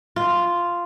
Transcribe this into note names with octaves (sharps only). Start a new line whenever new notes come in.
F4